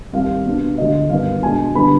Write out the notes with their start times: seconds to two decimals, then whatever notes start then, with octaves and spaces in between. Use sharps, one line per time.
0.13 C2 C3 D#3 F5
0.45 B2 B3 D4
0.77 D2 D3 G#3 D4 D#5
1.09 G2 D#3 B3 F5
1.42 B2 G#3 D4 G#5
1.75 D3 G3 B3 D4 B5